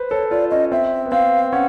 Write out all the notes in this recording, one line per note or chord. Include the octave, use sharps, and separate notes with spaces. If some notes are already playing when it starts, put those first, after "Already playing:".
Already playing: B4 C5
A4 C#5
F4 D5
C#4 D#5
C4 E5
B3
C4 F5
C#4 F#5